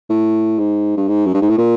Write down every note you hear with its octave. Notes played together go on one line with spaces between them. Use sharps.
A2
G#2
G2
G#2
F#2
G2
G#2
A2
A#2